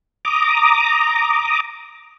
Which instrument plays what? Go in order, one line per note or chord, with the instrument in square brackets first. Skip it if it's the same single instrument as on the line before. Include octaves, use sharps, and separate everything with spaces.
[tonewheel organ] A#5 D6 D#6